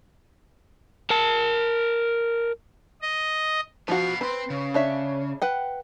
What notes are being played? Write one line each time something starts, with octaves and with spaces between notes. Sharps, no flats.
A#4 A5
D#5
F3 B3 F#4 F5
C4 B4 C6
C#3
D4 C#5 E5
B4 F#5 G5